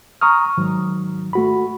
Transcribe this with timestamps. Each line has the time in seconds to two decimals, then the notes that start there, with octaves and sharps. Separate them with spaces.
0.21 A#5 C#6 D#6 F6
0.57 G#2 D#3 F#3
1.33 A3 F#4 B5